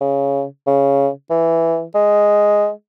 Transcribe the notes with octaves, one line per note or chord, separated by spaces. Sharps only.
C#3
C#3
E3
G#3